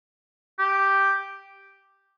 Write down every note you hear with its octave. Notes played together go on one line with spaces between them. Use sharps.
G4